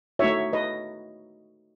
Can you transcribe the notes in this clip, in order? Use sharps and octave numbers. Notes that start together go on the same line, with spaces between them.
A3 D#4 F#4 C#5 E5
B4 D#5